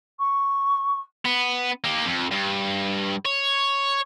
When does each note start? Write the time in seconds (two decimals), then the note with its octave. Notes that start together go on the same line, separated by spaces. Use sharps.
0.19 C#6
1.25 B3
1.84 A#3 G4
2.06 F2
2.32 G2
3.25 C#5